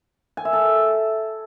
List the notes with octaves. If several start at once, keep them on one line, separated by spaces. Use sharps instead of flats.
G#5
E5
A4